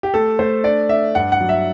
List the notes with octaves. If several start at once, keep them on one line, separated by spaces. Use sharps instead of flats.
G4
A3 A4
A3 C5
D4 D5
D4 E5
G2 F#5
F#5
F#3
E5